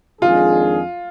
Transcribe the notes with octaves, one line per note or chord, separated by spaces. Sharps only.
F2 D#3 G#3 D4 F4 G#4